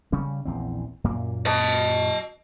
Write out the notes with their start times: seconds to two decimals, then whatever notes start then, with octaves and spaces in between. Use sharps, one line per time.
0.12 C#3 G3 C#4
0.45 A#1 E2 C4
1.04 F#2 A#2 A#3
1.46 D#5 A5